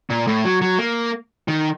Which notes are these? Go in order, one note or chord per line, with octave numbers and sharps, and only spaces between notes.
A#2
A2
F#3
F#3
A#3
D#3